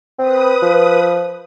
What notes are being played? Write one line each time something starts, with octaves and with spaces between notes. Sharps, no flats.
C4 B4 D#6
F3